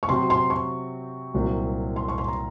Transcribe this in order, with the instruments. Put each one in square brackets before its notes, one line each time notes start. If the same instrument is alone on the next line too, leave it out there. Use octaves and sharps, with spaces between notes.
[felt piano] C#6
[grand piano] C3 F#3 C4 F#4 [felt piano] C6
[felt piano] C6
C#6
[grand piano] C2 A#2 F#3 C4 F#4
[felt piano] C6
C#6
C6
A#5